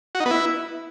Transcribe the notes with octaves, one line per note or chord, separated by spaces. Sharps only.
F#4
D#4
B3
E4